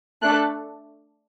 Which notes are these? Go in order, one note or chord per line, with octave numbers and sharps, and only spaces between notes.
A3 D4 A4 F#6